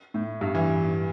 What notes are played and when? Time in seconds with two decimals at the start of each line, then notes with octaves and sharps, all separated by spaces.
0.14 A2
0.41 G2
0.55 E3